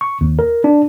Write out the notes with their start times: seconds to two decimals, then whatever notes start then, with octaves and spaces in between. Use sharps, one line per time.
0.01 C#6
0.21 D#2
0.39 A#4
0.64 D4